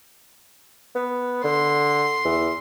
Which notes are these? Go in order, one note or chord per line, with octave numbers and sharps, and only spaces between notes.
B3
D3 C6
E2